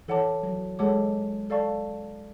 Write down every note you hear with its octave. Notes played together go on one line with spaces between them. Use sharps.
E3 A4 C#5 F#5 A5 D6
F#3
G#3 A4 C#5 F#5 A5 D6
A4 D5 F5 A5 C#6